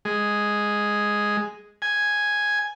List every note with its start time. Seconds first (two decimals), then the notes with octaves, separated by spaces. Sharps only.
0.05 G#3
1.82 G#5